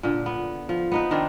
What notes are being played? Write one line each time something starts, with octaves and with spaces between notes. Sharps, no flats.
A#2 D3
B3
F3
B3 D#4 B4
D#3 C4 D4